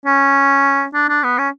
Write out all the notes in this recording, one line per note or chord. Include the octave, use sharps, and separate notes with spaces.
C#4
D4
D4
B3
C#4